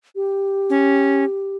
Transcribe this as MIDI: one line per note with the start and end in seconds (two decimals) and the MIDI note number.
0.16 1.57 67
0.70 1.24 61